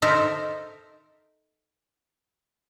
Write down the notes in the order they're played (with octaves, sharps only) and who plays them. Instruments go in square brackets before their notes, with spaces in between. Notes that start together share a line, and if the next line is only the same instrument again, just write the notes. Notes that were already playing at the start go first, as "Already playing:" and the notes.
[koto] D#4 A4 A#4 C5 E5